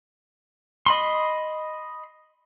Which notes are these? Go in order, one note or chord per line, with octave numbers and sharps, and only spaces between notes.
D#5 B5 C6